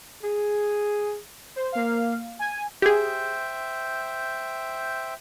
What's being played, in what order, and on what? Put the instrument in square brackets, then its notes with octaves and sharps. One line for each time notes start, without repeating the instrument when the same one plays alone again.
[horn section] G#4
[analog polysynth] C5
A#3 F5
G#5
[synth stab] G4 G#4 [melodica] C5 E5 G5